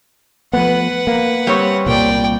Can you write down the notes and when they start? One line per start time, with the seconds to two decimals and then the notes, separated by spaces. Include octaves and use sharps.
0.53 F3 A3 B3 B4 F#5
1.07 A#3
1.47 G3 C4 C#5
1.86 C2 A#2 A#3 D5 G5